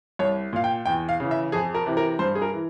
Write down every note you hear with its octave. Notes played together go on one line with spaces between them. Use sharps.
C2 C#5
A#2 F5
G5
E2 G5
F5
C#3 E3
E5
F2 G#4
A#4
C3 E3
A#4
G2 C5
G#4
A#4
E3